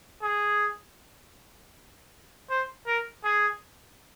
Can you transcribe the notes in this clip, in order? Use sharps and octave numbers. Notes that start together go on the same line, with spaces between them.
G#4
C5
A#4
G#4